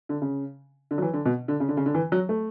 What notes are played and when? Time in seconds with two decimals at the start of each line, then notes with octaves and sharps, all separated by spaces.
0.09 D3
0.22 C#3
0.91 D3
0.98 F#3
1.02 E3
1.14 D3
1.26 B2
1.48 D3
1.60 C#3
1.69 D3
1.77 C#3
1.86 D3
1.94 E3
2.12 F#3
2.29 A3